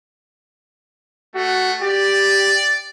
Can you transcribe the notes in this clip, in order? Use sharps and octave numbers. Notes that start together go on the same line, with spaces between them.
A3 F#4
G4 D5